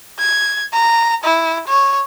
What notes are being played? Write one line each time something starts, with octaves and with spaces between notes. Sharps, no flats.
G#6
A#5
E4
C#5